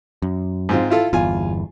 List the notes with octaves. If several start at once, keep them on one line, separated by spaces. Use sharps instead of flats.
F#2
G#2 C4 F4
E4 F4 A4
G1 E2 F4 G#5